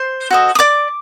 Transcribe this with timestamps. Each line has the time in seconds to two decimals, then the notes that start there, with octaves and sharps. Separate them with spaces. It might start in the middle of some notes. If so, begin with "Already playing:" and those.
Already playing: C5 C6
0.30 F#4 A4 C5 D#5
0.55 D#6
0.59 D5 D6